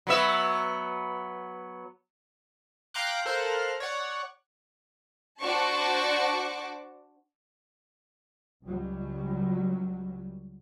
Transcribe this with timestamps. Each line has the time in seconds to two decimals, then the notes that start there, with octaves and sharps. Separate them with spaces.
0.07 F#3 B3 E5
2.94 F5 G5 A#5 C6 D6 F#6
3.25 A4 A#4 C5 F5 F6 F#6
3.80 C#5 D5 F#5
5.41 D4 F#4 C5 A5 C#6 D6
8.64 C#2 F#3 G3